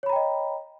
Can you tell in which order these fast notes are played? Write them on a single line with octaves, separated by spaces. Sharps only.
C#5 B5 A#5 G5 D#5